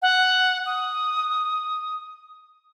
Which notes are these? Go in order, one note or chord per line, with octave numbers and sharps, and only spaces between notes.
F#5
D#6